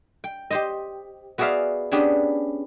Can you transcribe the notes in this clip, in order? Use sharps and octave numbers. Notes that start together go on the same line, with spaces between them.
G5
G4 C5 D#5
B3 F#4 G#4 D5 E5 F5
B3 C#4 D4 G4 G#4